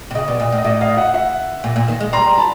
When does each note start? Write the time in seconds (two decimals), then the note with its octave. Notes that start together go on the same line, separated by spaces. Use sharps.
0.11 C3
0.15 C#3 D#5
0.28 B2 D5
0.40 A#2 D#5
0.52 A2
0.58 D#5
0.64 A2 D5 E5
0.81 D#5 F5
0.97 E5 F#5
1.14 E5 F#5
1.64 A#2
1.76 A#2
1.88 D#3
2.00 G#3
2.13 G3 A#5 C6
2.38 A5 B5